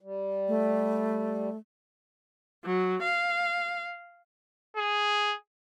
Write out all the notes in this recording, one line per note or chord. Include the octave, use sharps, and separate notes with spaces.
G3
A3
F#3
F5
G#4